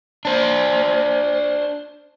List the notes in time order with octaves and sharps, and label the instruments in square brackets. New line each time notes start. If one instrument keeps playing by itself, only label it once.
[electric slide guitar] D4 C5